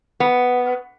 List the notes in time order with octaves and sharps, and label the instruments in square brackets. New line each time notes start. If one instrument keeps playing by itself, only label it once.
[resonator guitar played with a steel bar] B3